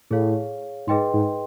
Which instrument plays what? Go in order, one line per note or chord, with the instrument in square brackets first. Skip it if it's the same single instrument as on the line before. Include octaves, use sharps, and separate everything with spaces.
[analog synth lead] A2 [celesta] G#4 C#5 F5
[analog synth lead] G#2 [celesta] G#4 B4 D#5 G5 C6
[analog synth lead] G#2